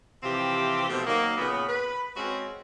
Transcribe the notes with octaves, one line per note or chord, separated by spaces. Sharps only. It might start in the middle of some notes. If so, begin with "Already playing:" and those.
C3 E3 F3 C4 G4
B2 D#3 F3 A3 C4
D#3 F#3 A#3
A#2 C#3 B3
B4
G#3 C4 C#4 F#4